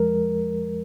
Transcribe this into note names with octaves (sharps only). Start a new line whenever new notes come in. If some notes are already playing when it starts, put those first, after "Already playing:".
Already playing: F2 F3 G#3 A#4